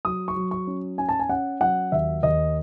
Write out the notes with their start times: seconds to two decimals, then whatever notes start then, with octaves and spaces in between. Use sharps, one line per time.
0.05 F#3 D#6
0.28 C#6
0.36 F#3
0.51 C#6
0.67 C#4
0.98 C#4 G#5
1.09 A5
1.19 G#5
1.29 C#4 F#5
1.61 F#3 F#5
1.92 D#2 E5
2.23 D#2 D#5